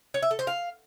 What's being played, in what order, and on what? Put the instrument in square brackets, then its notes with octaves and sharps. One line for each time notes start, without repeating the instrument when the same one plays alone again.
[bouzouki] C#5
E5
A4
C5
F5